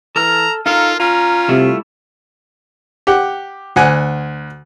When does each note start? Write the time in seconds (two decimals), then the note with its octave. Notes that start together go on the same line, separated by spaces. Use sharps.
0.16 E3 A4 A#5 F6
0.66 D#4 F4 A4 A#4 F5
1.00 C#4 F4 A#5
1.49 C3 G3 A3 E4
3.07 G4 F#5
3.76 D2 F#5 G#5